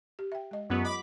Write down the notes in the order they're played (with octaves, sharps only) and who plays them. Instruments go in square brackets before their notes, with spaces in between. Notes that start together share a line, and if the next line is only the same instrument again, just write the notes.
[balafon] G4
E5 G5
G#3 D#5
[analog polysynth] F#2 B3 [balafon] F#3 F4 G4
[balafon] D#5 [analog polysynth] B5 D6 B6